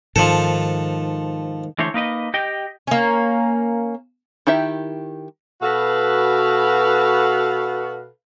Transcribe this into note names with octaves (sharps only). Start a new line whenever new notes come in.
G#2 D#3 F3 A4
D3 E3 A3 C5 C#5
A#3 D#4 B4 D#5
G4 D#5 G5
A#3 C#4
D#3 E4 G4 E5
B2 F#4 A4 B4 F5